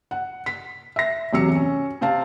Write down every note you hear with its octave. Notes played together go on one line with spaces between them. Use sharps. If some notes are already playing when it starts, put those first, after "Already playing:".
F#5
B6
E5 A#6
E1 C3 F#3 E6 C#7
C#4
C3 C4 F5 A5